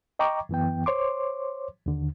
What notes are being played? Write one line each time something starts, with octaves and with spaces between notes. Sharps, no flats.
D#5 G5 A#5 C#6 D6
F#2 E3 B3 G5
C5 C#5 C6 D6
D#2 D3